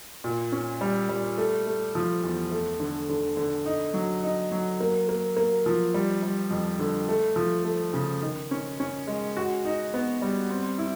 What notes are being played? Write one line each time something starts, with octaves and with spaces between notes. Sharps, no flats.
A#2
C#4
G3
G3
A3
A3
F3
E2
A3
D3
D3
D3
D#4
F#3
D#4
F#3
A#3
A#3
A#3
F3
G3
G3
F2
D3
A3
F3
A3
C#3
D#3
C#4
C#4
G#3
F#4
D#4
B3
G3
C4
E4